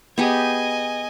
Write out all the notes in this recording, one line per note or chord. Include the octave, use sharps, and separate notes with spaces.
B3 G4 G#4 D#5 G#5